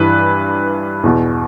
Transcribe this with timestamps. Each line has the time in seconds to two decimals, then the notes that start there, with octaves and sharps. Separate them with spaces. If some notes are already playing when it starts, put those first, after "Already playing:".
Already playing: G2 E3 B4
1.04 E2 B2